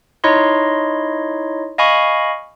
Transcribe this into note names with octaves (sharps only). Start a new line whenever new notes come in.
D#4 E4 C#5 D#5 C6
D#5 F5 G#5 B5 C#6